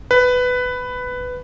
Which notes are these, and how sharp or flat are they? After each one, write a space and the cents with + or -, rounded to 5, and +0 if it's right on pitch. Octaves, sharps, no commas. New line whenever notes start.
B4 +10